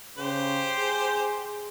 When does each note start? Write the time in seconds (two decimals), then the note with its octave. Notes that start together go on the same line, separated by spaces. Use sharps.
0.18 C#3 G4 C5
0.76 G#4